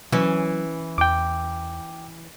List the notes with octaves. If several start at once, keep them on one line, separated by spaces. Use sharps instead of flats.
E3 F#3 C#4
E2 G5 D6